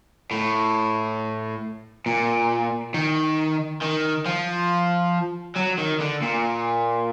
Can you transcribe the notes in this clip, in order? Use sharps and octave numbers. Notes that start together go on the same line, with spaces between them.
A2
A#2
D#3
D#3
F3
F#3
D#3
D3
A#2